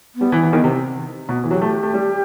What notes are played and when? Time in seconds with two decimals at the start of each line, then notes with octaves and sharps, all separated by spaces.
0.15 B3
0.21 G3
0.32 E3
0.43 E3
0.53 D#3
0.64 C3
1.29 B2
1.43 E3 A4
1.50 F#3 G4
1.62 A3
1.83 A3
1.94 G3